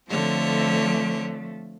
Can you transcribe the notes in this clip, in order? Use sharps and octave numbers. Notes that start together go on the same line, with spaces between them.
D3 F3 A3 C4 C#5